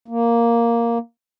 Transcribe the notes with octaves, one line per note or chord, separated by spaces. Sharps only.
A#3